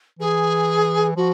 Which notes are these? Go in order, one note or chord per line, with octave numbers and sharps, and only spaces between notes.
E3 G#4
F3 F#4